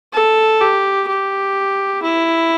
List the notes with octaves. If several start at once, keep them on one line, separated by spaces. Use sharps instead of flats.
A4
G4
G4
E4